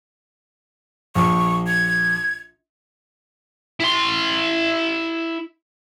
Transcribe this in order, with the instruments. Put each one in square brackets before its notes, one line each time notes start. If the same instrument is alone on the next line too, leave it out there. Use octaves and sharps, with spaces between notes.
[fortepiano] A#1 [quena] C#6
[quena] G#6
[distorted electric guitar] E4 C6